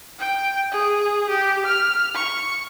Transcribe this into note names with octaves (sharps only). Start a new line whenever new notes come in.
G5
G#4
G4
F6
C#6